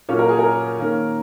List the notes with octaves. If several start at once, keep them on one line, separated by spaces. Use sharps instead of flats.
A#2 F#3 A#3 C#4 C#5
A#4
G#4
A#4
D#3 A#3 C#4